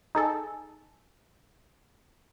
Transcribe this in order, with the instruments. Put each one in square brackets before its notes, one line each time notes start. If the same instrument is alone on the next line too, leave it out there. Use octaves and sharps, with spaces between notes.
[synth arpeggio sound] D#4 G#4 A4